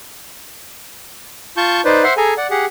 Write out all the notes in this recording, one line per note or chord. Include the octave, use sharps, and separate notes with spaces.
F4 A5 C#6 G6
D#4 B4 C5 D5
C5 E5 F#5 C6
G#4 A4 G#5 A#5
D5 F#5
G4 G#4 F#5